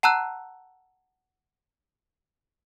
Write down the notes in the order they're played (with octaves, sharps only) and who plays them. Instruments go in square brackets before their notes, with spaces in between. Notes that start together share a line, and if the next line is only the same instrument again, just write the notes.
[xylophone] F#5 A5 A#5 E6 F#6